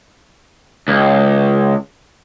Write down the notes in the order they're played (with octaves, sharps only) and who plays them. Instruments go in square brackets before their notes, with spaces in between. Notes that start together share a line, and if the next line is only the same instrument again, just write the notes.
[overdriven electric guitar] C#2